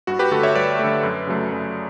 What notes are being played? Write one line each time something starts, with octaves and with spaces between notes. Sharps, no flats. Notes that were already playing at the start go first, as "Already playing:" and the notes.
G2 F#4
G4 B4
D3 A3 F#4 A4
C#5 E5
G2 B4 D5
D3 A3
F#2
C#3 F#3 A3
F#2